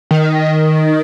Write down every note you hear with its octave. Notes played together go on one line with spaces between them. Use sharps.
D#3